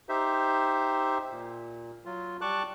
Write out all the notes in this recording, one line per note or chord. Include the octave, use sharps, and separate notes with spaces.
D#4 G4 C5 E5
A#2
F#3 F4
G3 A5 C#6 D6 F#6